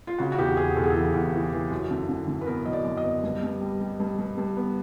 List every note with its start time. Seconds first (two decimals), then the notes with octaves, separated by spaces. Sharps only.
0.07 F4
0.18 C#3 F#4
0.32 F#4
0.38 E2 G4
0.57 E2 G#4
0.76 E2 A4
0.84 G#4
0.90 E3 A4
1.14 E2
1.34 E3
1.53 E3
1.71 F#2
1.91 D3
2.09 D3
2.28 D3
2.41 B4
2.47 B3 A#4
2.65 F#2 D#5
2.73 D5
2.85 F#2
2.97 D#5
3.04 B3
3.23 G2
3.43 G2
3.61 G3
3.81 G3
4.00 G2
4.19 G2
4.38 G2
4.57 B3